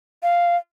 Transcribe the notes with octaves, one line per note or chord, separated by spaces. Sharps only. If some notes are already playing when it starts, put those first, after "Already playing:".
F5